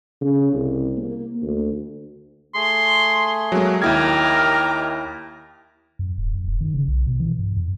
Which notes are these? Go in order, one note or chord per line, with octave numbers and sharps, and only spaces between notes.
C#3
C2
A#3
D2
A3 G#4 C6
F#3 G#3 A#3
D#2 E4 G4 A#4 D#5 D6 G#6
F#2
D#1
F#2
E1
D#3
C#3
B1
B2
E3
G2
F2